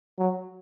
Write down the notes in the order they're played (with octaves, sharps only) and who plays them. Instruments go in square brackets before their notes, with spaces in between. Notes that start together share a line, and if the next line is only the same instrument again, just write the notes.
[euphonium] F#3